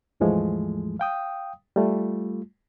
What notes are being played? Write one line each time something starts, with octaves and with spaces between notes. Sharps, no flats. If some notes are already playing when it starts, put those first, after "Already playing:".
D#2 G#2 E3 F3 G#3 A3
F5 G5 D#6
G3 A3 F4